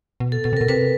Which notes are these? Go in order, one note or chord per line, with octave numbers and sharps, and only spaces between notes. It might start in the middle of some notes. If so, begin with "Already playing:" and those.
B2
A4
B2 A4
C3
B2 A#4
C3 B4